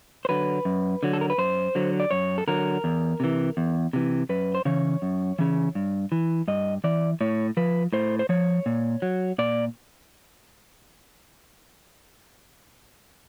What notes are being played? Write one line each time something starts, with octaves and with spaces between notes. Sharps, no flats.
C5
D3 F#3 B4
F#2
D3 F#3
A4
A#4
B4
F#2 C5
D3 F#3
D5
F#2 C#5
A4
D3 F#3 A#4
E2
C3 E3
E2
C3 E3
F#2 B4
C5
C#3 E3 C#5
F#2
C#3 E3
G2
E3
G2 D#5
E3 D5
A2 C#5
F3 B4
A2 C5
C5
F3 C#5
A#2
F#3
A#2 D5